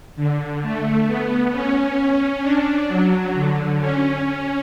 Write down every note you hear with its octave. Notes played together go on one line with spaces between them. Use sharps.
D3
A3
B3
C#4
D4
F#3
D3
C#4
C#4